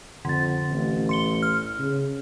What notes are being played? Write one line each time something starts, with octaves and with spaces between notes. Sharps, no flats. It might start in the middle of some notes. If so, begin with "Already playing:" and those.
F2 D3 A6
A1
C6 C#7 G7
F6
C#3